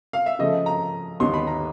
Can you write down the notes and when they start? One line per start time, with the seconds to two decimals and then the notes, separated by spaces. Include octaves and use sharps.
0.13 F5
0.26 E5
0.39 C#3 F3 A3 D#5
0.66 A#5
1.20 D#2 D3 G3 B3 D#4 C6
1.34 B5
1.47 A#5